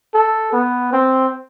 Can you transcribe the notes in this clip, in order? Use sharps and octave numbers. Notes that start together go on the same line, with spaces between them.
A4
B3
C4